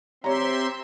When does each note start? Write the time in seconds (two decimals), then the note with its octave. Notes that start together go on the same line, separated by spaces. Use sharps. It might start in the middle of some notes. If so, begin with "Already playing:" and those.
0.24 C4 G4 C#5 E5 A#5 C6